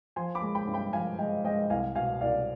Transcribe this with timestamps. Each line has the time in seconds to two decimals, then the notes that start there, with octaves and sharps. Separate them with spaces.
0.16 F3 G#5 C6
0.35 B5 D6
0.42 G#3
0.55 G5 B5
0.67 G2
0.74 G5 B5
0.93 F3 F5 G#5
1.19 G#3 D#5 G5
1.44 G#3 D#5 G5
1.70 C2 F5 G#5
1.95 B2 F5 G#5
2.21 C2 D5 F5